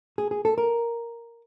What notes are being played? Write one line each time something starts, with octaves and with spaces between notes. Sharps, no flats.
G#4
G#4
A4
A#4